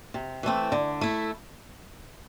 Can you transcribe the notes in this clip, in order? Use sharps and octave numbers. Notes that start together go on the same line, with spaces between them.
C3
E3 A3 C4
D3
A3 E4